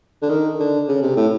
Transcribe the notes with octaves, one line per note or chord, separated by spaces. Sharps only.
D3
D#3
D3
C#3
C3
A2